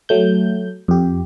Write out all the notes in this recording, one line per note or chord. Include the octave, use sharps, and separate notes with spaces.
F#3 A3 G6
F2 G4